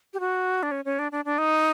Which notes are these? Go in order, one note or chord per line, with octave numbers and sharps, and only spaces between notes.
G4
F#4
D4
C#4
C#4
D4
D4
D4
D#4